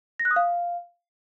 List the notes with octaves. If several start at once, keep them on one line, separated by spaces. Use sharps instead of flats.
A#6
F#6
D#6
F5